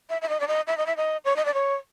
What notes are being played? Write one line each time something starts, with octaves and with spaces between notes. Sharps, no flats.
E5
E5
D#5
D5
D#5
E5
D#5
E5
D#5
C#5
D#5
D5
C#5